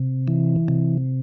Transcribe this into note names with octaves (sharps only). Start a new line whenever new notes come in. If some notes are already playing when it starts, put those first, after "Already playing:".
Already playing: C3
E3
C3